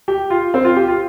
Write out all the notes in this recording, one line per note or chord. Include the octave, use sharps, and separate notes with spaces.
G4
F4
C4
F4
G4
F4